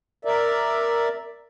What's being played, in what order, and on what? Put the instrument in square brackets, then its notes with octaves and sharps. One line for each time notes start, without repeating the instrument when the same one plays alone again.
[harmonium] A#4 D5 E5